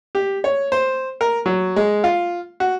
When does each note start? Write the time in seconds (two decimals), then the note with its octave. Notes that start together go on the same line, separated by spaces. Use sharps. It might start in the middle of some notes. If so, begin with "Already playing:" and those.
0.15 G4
0.44 C#5
0.72 C5
1.21 A#4
1.46 F#3
1.76 G#3
2.04 F4
2.60 F#4